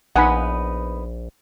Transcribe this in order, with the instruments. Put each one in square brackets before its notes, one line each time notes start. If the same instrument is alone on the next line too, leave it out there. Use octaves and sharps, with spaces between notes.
[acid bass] A#1 [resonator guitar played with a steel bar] B3 D#4 B4 [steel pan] F#5 G#5 B5